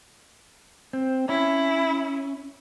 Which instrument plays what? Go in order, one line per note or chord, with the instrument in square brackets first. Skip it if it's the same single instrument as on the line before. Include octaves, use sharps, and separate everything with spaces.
[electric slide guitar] C4
[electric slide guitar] C#4 [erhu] E4